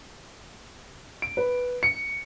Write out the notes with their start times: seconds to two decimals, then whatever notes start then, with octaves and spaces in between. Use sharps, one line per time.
1.22 D7
1.37 B4
1.83 C#7